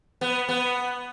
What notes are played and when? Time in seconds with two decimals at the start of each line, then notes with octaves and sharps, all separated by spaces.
0.21 B3
0.49 B3